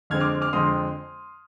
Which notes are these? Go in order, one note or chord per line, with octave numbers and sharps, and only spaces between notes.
F2 D3 G#3 C4 F6 G#6
D6 F6
D6 F6
F2 D3 G#3 C4 C6 D#6